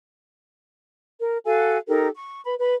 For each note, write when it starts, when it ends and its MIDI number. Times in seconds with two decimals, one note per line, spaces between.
1.20 1.38 70
1.45 1.77 66
1.45 1.77 69
1.45 1.77 77
1.45 1.77 80
1.88 2.08 63
1.88 2.08 67
1.88 2.08 69
1.88 2.08 70
2.16 2.41 85
2.46 2.55 71
2.46 2.55 83
2.59 2.75 71
2.59 2.75 83